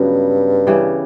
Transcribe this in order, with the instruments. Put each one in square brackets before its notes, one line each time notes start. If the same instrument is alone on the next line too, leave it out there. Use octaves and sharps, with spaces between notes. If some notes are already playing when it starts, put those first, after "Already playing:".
Already playing: [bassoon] G2 [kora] C#3 F#3 B3
[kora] C#3 E3 G3